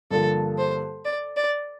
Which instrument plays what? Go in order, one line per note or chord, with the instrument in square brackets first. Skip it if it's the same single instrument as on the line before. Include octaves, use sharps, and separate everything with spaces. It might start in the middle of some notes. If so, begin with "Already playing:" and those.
[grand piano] G2 D3 F3 A#3 [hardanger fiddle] A4
[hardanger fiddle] C5
D5
D5